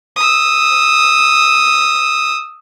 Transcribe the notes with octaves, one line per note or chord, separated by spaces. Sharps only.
D#6 E6